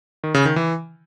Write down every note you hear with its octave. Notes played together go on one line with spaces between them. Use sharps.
D#3
C#3
D#3
E3